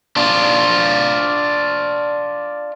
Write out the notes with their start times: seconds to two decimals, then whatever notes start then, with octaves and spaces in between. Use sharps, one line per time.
0.16 D4 F4